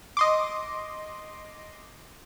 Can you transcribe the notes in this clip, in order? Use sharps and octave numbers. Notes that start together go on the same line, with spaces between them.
D#5 C6 D6